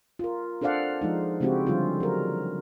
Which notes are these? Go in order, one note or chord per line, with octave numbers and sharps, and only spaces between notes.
F4 A#4
D4 A4 C5 D5 F5 F#5
F3 G#3 D#4
C#3 G#3 C4 E4 F#4 G4
D3 F3 G3 C#4 F4
F#3 A#4